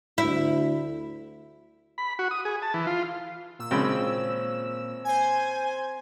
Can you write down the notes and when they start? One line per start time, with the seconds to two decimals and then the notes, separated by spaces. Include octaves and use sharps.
0.18 D2 E4
1.98 B5
2.19 F#4
2.31 D#6
2.45 G#4
2.62 A5
2.74 E3
2.87 F4
3.59 A#2 E6
3.71 G#1 C#3 C4 B5
5.05 C5 G#5 G#6